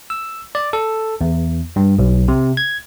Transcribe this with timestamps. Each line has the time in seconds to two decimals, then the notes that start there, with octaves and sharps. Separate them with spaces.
0.10 E6
0.55 D5
0.73 A4
1.21 E2
1.76 G2
1.99 B1
2.28 C3
2.57 G#6